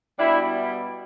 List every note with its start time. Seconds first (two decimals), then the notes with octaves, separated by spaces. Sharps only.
0.18 B2 G3 D4 E4